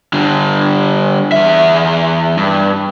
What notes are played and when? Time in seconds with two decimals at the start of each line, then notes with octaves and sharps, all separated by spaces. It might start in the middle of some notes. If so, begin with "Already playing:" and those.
0.13 D3 G3
1.32 E2 E5
2.37 G2